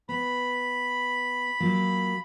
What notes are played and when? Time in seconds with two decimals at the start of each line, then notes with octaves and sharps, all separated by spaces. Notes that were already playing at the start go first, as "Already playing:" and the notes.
0.09 B3 B5
1.60 F#3 A#3 F4